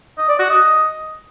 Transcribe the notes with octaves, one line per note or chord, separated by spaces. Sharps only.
D#5
D5
F#4
D#5